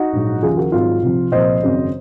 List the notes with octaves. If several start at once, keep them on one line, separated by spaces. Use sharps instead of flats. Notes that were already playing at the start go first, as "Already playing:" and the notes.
Already playing: D#4 F#4
A#1 G#2 F#3
D#2 C#3 F3 F4 G#4
F#4 A#4
G#1 G#2 F#3 F4
C2 C3 F3
C2 A#2 F3 C5 D#5
G#1 F#2 C#3 F#3